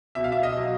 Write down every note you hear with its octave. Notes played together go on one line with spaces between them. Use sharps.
B2 E5
F5
E5
D#5
F#3